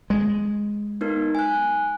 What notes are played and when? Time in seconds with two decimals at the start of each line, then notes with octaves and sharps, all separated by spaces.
0.10 G#3
1.01 B3 D#4 A#4
1.35 G#5 F#6